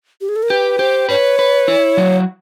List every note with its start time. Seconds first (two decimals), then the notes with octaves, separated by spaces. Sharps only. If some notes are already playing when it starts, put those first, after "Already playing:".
0.21 G4
0.29 G#4
0.36 A4
0.43 A#4
0.50 G4 B4
0.79 G4 C5
1.09 B4 C#5
1.39 B4
1.68 E4
1.97 F#3